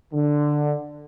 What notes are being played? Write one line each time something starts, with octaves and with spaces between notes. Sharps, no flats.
D3